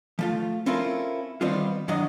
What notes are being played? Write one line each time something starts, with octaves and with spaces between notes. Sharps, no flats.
F3 A3 F4
C4 C#4 E4 F4 A4 A#4
D#3 G3 B3 C4 F4
F#2 D#3 F#3 D4 D#5